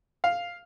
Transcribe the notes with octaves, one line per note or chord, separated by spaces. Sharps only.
F5